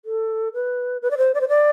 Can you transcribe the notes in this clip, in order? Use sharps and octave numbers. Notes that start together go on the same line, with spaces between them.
A4
B4
B4
D5
C5
D5
C5
D5